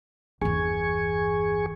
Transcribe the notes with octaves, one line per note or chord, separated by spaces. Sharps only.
G1 E2 G#4 G#5 C#6